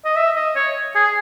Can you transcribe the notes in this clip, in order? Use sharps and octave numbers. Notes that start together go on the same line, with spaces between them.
D#5
E5
D#5
C#5
G#4